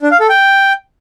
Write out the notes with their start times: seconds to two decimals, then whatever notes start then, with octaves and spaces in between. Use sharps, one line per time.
0.02 D4
0.11 F5
0.20 A4
0.29 G5